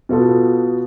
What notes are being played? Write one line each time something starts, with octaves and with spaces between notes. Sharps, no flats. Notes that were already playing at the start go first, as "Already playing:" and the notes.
B2 B3 F4 A4